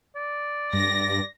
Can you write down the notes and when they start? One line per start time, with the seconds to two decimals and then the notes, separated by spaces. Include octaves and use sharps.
0.15 D5
0.73 G2 A#6